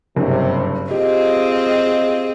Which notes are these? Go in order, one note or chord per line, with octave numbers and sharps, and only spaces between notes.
F#1 G2 C3
C4 F4 G4 G#4 D#5